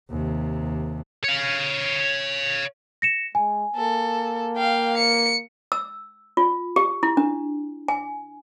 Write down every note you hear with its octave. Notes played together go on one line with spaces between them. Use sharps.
D#2 C3
C#5 F5
A#6 C#7 E7
G#3 G#5
A#3 A4
F5 G5
C#7
E6
F4
G4
E4
D4
G#5